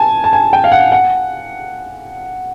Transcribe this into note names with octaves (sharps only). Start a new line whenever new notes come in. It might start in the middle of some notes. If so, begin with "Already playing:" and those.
Already playing: G#5 A5
A5
G#5
G5
F5
F#5
F#5